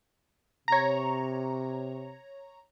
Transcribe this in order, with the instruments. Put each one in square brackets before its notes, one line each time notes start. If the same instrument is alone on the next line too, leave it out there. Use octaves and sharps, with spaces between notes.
[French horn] C3 [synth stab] C#5 A#5